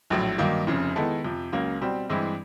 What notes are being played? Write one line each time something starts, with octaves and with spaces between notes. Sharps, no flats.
A#1 A2 F#3
G2 D#3 F#3 A#3 D#4
F1 F2 C#3
D#3 G#3 B3 E4 A4
F2 C3 F3
C#2 C#3 F#3 A#3
B2 G3 C4
G2 E3 G#3 C4 E4